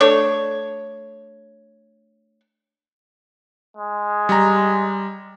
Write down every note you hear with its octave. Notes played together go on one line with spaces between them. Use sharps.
A3 D4 C#5
G#3
G3 A#5